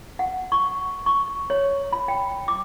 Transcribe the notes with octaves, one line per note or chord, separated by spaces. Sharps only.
F#5
C#6
C#6
C#5
B5
G5
D6